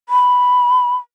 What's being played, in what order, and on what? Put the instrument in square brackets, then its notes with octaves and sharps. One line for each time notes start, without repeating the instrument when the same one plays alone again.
[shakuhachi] B5